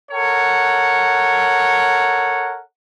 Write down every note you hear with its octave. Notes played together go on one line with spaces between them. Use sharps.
A4 A#4 C#5 F#5